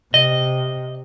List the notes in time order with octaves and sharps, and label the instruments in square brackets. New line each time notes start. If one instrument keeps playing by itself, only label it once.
[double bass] C3 [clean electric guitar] D#5